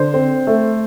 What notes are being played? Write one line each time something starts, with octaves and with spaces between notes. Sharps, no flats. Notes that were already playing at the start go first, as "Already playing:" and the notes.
Already playing: D3 C5
C4
A3